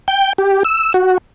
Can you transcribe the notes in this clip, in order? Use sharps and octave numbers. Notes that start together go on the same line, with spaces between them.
G5
G4
E6
F#4